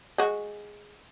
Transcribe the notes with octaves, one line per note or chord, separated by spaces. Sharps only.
G#3 F#4